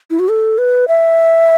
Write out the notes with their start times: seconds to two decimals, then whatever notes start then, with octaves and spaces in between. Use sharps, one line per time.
0.10 E4
0.19 F#4
0.29 A4
0.58 B4
0.88 E5